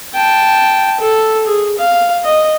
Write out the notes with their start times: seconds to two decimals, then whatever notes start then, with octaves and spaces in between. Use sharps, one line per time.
0.14 G5 A5
1.00 A4
1.47 G#4
1.78 F5
2.24 D#5